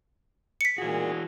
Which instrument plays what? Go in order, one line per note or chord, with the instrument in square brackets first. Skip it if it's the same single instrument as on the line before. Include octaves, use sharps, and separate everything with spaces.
[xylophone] B6 C#7
[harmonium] A#2 G#4 [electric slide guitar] E3 F#4